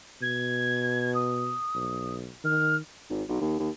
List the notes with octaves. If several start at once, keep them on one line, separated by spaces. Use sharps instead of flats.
B2 G#6
D#6
B1
D#3 F6
G#1
B1
D#2
D#2